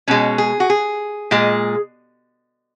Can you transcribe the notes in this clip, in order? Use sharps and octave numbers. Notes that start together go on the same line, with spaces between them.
B2 G#3 C#4
G#4
F#4
G#4
A#2 G#3